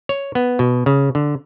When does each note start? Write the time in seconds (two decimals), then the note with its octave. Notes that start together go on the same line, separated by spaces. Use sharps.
0.09 C#5
0.35 B3
0.59 B2
0.86 C#3
1.15 D3